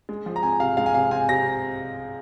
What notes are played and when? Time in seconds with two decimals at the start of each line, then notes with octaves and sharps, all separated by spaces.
0.09 G#3
0.26 F3
0.36 A#5
0.43 C4 G#5
0.60 C3 F5
0.77 G#3 F5
0.86 G#5
0.94 C3 F5
1.11 C4 G#5
1.29 C3 A#6